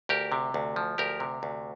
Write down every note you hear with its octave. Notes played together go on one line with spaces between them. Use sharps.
D2 G4 A#4
C3
D2
F3
D2 G4 A#4
C3
D2